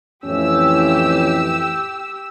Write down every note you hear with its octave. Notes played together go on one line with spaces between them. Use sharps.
F2 A2 E3 C#4 G4 E6